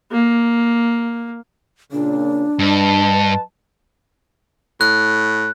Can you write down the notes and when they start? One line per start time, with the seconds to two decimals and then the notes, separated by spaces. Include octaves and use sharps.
0.12 A#3
1.92 A#2 C#3 D4
2.59 G2 B4 D#5 A5
4.81 A2 F#6